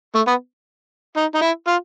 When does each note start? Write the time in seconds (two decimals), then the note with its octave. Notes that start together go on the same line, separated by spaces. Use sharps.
0.15 A3
0.27 B3
1.17 D#4
1.35 D#4
1.42 E4
1.67 F4